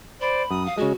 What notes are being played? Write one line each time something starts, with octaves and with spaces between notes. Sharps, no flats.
C5 D5 B5
F#2 D#6
F5
C#3 G#3 F#4